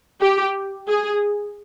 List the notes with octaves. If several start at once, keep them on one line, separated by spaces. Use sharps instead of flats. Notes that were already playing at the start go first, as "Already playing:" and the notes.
G4
G#4